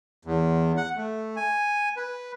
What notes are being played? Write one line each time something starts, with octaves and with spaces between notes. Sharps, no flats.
E2
F#5
A3
G#5
B4